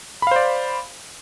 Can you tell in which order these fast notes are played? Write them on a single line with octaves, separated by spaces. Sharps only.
B5 F5 C5 D5